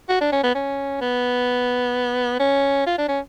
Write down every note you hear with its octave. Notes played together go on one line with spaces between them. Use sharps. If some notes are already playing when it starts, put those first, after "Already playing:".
F#4
D4
C#4
B3
C#4
B3
C#4
F4
D4
C#4